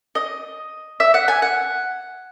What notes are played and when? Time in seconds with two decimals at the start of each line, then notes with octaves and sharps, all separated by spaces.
0.15 D#5
1.00 E5
1.14 F#5
1.28 G#5
1.42 F#5